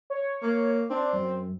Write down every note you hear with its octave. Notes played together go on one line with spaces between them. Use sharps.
C#5
A#3
C4 D4
F#2